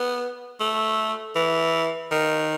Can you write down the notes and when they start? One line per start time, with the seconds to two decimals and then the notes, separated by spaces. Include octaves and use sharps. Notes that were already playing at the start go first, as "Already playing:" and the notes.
Already playing: B3
0.60 A3
1.35 E3
2.11 D#3